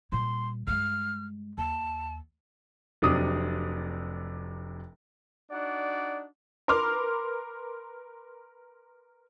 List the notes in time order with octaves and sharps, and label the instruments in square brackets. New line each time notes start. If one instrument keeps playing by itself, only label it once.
[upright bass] A#2 G3 [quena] C6
[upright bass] G2 G#3 [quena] F6
[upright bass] D#2 [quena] A5
[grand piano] F1 C3 F#3 D4 D#6
[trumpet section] D4 D#4 F#4 D5 F#5
[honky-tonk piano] A#4 B4 C6 D6 F6